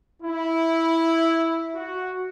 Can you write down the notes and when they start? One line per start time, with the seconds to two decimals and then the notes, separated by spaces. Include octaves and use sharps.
0.23 E4
1.75 F#4